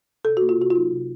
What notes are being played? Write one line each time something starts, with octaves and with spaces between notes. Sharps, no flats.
C3 A4
A#3 F#4
F4
C3 F#4
F4
F#3 D#4
C3